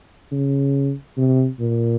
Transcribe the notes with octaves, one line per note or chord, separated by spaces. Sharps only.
C#3
C3
A#2